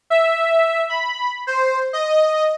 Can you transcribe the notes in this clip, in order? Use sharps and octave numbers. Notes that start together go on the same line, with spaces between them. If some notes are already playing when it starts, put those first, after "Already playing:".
E5
B5
C5
D#5